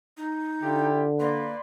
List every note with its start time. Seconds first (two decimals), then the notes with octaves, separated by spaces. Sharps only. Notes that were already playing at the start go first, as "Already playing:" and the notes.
0.17 D#4
0.63 D3 E4 F4 G4
1.19 A#3 B4 D5 C6